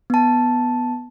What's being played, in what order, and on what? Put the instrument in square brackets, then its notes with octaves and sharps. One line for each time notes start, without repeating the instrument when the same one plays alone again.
[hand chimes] B3 A5